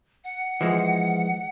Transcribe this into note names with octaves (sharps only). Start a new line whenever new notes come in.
F#5
E3 F3 G#3